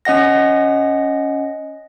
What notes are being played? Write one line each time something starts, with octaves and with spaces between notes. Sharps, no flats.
C#4 D#5 F#5 A#6